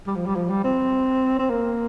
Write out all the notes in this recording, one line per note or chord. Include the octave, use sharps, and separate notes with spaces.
G3
F3
G3
F3
G3
C4
C4
A#3